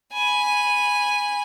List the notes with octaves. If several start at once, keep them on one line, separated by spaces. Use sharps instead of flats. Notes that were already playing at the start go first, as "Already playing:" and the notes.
G#5 B5